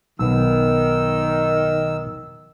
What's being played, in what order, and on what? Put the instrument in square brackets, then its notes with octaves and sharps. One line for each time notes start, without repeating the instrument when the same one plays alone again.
[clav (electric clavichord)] B1 B3 [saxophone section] D#3 [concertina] E6